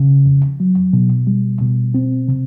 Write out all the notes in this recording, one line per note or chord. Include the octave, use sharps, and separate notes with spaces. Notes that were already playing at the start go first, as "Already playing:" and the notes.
Already playing: C#3
F2
F#3
B2
G3
B2
C4
C3